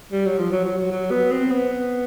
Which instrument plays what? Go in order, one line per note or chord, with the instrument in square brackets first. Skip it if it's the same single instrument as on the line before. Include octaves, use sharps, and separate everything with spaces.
[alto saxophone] G3
F#3
F3
F#3
F#3
F#3
F#3
B3
C4
B3